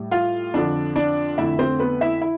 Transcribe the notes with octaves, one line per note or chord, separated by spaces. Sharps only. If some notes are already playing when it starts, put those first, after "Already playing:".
Already playing: A2 G3
F4 F5
F2 D3 F3 D4 D5
D4 D5
F2 D3 A3 E4 E5
C4 C5
B3 B4
E4 E5
E4